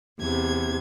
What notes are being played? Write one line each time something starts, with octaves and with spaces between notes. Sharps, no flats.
E2 C3 G#6